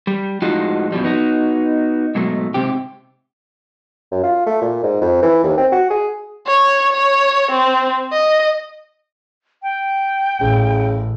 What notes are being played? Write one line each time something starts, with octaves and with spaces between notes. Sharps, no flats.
G3
A2 F3 G#3 D#4 F4 F#4
F#2 B2 F3 G3
B3 D#4 F#4
G#2 B2 F#3 A3
G#2 C3 C4 G4
F#2
F4
A3
A#2
G#2
F2
E3
D#2
C4
F#4
G#4
C#5
C#5
C4
D#5
G5
A1 C#3